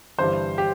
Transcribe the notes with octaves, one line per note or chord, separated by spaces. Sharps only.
G1 G2 E3 G3 D4 C5
G4